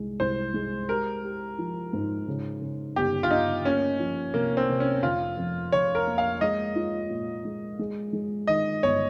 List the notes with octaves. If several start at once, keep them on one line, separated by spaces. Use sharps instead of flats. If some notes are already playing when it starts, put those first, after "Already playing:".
Already playing: C2 G#3
C2 C5
G#3
G4 A#4
G4
F3
G#2
C#3
C#3
G1 G4
F4
G1 D#4
A#3 C#4
F3
C3 A#3
C4
C3
C#4
F1 F4
F2
F1 C#5
A#4
A#3
F5
G#3 D#5
F4
A#2
G#3
G#3
G#3
D#3 D#5
G1 C#5